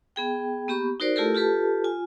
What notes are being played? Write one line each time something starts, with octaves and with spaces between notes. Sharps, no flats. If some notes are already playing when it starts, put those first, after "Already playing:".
B3 G#4 G5
A#3 B3 G4 B5 C#6
D#4 F#4 A#4 C5 D5
A3 E4 F4 G4 A4 A#4
F4 G4 A4 B4 A5
F4 G#5